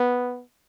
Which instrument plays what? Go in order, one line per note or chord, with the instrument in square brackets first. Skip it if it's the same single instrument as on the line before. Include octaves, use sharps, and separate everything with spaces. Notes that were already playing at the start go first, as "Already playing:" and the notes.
Already playing: [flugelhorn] B3